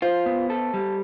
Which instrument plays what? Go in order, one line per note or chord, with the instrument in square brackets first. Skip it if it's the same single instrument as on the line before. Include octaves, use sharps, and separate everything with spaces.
[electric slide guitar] F4 [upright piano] C5
[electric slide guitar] B3
A4
G3